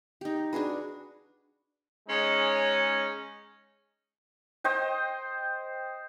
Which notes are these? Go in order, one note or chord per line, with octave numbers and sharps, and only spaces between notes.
D#4 G4
D4 F#4 G#4 B4
G#3 C#4 D#4
C5 D#5 G5